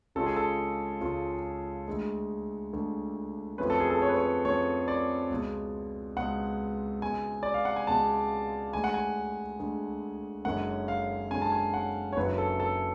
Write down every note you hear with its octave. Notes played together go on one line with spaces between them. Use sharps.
C#2 C#3 G#3 C#4 F4 A4
G#4
A4
C#2 C#3 G#3 C#4 F4
D2 D3 G#3
D2 D3 G#3
F2 F3 A3 C#4 B4
A4
G#4
A4
C#5
B4
C#5
F2 F3 A3 C#4 C#5
D5
C#2 B2 G#3
C#2 B2 G#3 F#5
C#2 B2 G#3 G#5
D5
F5
F#5
G#5
C#2 B2 G#3 A5
D2 D3 G#3 G#5
F#5
G#5
D2 D3 G#3
F#1 F#2 D3 G#3 C#4 F#5
F5
F#1 F#2 D3 G#3 C#4 G#5
A5
G#5
F#5
C#5
F#1 F#2 D3 F#3 C#4 B4
A4
A4